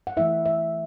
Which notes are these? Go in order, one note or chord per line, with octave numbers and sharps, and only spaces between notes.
F#5
E3 A3 E4 E5
E5